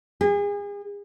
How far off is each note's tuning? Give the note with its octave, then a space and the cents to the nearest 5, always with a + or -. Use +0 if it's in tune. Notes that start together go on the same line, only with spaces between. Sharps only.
G#4 -35